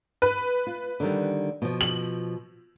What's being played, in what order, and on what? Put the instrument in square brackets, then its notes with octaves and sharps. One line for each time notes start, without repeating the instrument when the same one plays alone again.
[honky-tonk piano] B4
[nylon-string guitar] F4
D3 D#3 G3
B2 F3
[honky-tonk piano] F#7